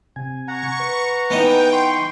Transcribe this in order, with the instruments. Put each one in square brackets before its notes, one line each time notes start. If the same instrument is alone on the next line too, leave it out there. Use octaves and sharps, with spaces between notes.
[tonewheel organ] C3 G#5
[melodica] F#5 A#5 [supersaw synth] C#6
[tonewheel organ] B4
[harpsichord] E3 B3 D#4 [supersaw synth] G5
[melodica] C6 C#6